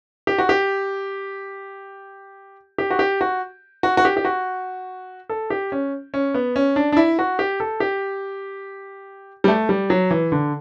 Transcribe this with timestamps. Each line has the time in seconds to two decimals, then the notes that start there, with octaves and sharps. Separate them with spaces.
0.27 G4
0.38 F#4
0.49 G4
2.78 G4
2.91 F#4
2.99 G4
3.21 F#4
3.83 F#4
3.97 F#4
4.05 G4
4.17 G4
4.25 F#4
5.30 A4
5.50 G4
5.72 C#4
6.14 C#4
6.34 B3
6.56 C#4
6.76 D4
6.92 D4
6.97 E4
7.19 F#4
7.39 G4
7.60 A4
7.80 G4
9.44 G3
9.48 A3
9.69 G3
9.90 F#3
10.11 E3
10.32 D3